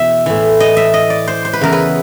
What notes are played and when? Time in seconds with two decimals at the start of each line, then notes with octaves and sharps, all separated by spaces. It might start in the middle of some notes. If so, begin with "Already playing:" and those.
Already playing: E2 B2 E5
0.26 A2 E3
0.60 D#5
0.77 E5
0.94 D#5
1.10 D5
1.28 C5
1.45 C5
1.53 B4
1.61 E2 C#3 E3 A#4
1.73 B4